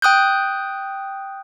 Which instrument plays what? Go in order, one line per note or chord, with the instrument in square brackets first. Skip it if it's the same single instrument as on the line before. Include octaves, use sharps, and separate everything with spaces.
[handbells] G5 D#6 F#6 G6